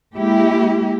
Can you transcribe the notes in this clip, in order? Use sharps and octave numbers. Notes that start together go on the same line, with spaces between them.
G#3 A#3 E4 G4